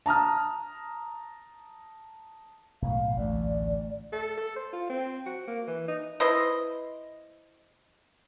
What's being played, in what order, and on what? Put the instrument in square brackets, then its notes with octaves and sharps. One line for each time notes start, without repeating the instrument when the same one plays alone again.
[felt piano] A5 A#5 D#6 F6
[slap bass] B1 A2 [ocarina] F5
[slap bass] A1 D2 A3 [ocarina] D5
[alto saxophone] A4
A4
C5
F4
C4
F#4
A#3
E3
D#4
[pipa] E4 B4 C5 D#5